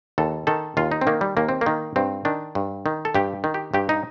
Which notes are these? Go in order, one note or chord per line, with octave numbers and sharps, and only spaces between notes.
D#2 A4
D#3 A4
D#2 F4
D#4
C4
D#3 A#3
G3
D#2 A#3
C4
A#3
D#3
G2 C4
D#3 D4
G2
D#3
A4
G2 G4
D#3
G4
G2 G4
D#4